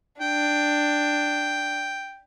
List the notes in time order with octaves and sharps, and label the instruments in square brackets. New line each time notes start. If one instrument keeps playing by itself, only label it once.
[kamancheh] D4 [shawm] G5